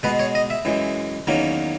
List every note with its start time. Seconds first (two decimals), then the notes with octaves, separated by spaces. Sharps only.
0.03 B2 G#3 B3 B4
0.19 C#5
0.35 D#5
0.50 E5
0.65 F#2 E3 G#3
1.27 E2 D#3 F#3 A#3 C#4